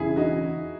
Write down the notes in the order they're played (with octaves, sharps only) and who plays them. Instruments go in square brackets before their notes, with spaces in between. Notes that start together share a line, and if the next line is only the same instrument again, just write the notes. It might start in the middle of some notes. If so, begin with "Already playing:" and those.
Already playing: [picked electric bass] E1 E2 C#3 [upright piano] E4 G#4
[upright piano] D#4 F#4